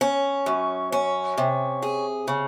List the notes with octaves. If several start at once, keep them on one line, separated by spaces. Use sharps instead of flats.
C#4
F#2
C#4
C3
G#4
C#3